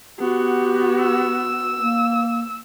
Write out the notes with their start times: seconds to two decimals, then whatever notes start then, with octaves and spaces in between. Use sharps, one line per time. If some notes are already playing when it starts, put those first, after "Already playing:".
0.19 B3 F#4 G4
1.00 E6
1.80 A#3